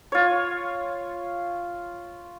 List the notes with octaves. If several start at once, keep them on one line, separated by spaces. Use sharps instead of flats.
F4 C#5